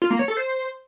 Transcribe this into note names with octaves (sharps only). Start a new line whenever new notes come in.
F4
A#3
C#5
A4
C5